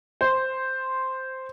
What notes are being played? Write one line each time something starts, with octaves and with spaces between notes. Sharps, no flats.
C5